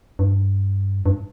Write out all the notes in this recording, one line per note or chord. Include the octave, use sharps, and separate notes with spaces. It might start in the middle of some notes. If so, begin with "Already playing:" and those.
G2
G2